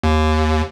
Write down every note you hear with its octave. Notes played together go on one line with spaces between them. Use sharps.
D#2